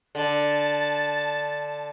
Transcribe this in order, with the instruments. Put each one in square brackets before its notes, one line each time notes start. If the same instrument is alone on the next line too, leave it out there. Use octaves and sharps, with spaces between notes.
[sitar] D3 [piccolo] A5